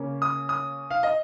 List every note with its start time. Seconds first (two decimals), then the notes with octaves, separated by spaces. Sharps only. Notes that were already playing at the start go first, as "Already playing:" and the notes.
Already playing: C#3 A#3 C#4
0.22 D#6
0.49 D#6
0.91 F5
1.03 D#5